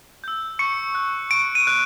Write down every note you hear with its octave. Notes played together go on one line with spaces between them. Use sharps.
E6 G6
C#6 C#7
F#6
C#6 D7
D#7
F#6